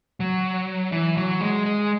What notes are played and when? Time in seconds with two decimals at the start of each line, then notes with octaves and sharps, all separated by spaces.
0.20 F#3
0.92 E3
1.17 F#3
1.41 G#3
1.65 G#3